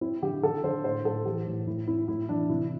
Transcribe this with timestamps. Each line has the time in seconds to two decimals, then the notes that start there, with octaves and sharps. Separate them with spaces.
0.01 C4 E4
0.22 D3 G4
0.43 D3 A4
0.64 D3 C5
0.84 A2 C5
1.05 A2 A4
1.25 E3 G4
1.46 A2
1.67 A2 E4
1.87 C4 E4
2.08 A2 E4
2.29 E3 D4
2.49 C3 E4